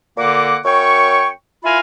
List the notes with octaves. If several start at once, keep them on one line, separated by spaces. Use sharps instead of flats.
A#2 D3 A#3 F#5 D6
F#2 C#5 G5 C#6
E4 F4 A#4 F5 G#5 B5